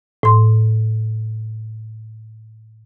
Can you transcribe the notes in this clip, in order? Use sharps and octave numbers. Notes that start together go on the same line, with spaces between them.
A2 C6